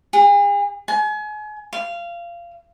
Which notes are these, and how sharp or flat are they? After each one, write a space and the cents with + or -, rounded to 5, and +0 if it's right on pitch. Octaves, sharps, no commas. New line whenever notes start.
G#4 -40
G#5 +35
F5 -20